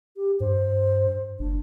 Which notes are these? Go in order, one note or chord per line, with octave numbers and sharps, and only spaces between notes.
G4
G2 C5
F#1 D4